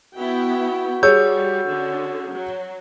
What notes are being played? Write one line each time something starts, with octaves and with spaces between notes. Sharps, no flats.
B3 E4 F#4 G5
G3 G#4 C#5 E6 G6
D3 C#4
F#3